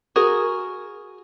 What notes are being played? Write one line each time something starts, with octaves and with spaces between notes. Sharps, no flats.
F#4 G#4 A#4